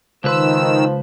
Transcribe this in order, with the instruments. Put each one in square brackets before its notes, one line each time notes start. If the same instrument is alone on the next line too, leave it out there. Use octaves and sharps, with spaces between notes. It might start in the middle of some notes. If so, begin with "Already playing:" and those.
[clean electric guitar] C#2 B4 C5 [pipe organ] D#3 E6 [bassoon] F3